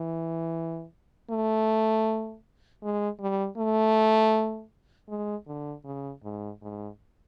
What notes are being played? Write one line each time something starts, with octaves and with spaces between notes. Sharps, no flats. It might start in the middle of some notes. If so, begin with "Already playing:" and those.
Already playing: E3
A3
G#3
G3
A3
G#3
D3
C#3
G#2
G#2